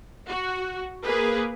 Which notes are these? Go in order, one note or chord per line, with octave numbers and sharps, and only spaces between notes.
F#4
A#3 G#4 A#4 B4